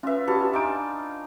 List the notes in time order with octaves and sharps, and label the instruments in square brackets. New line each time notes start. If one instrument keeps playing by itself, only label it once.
[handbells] C#4 B4 [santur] F4 E5
[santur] B3 C#4 A5 [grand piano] D4 F#4 [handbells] G4
[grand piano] D4 G#5 D7 [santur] D#4 F4 [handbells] D6